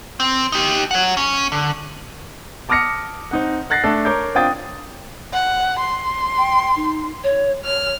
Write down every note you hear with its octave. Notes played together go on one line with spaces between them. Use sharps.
C4
D#4 G4
C#5 F#5
C#4
D3
A5 D6 D#6 F6 A#6 C#7
C4 D#4 F#5
F#5 F#6 A6 A#6 C7
A3 D4 A4
A#4 C#5 A#5 D6 G6
C4 D4 F4 G5 D#6 A6
F#5
C6
G5
D#4
C#5
C#5 F6